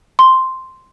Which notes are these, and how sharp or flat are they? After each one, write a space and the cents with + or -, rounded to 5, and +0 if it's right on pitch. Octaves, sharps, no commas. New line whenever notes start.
C6 +0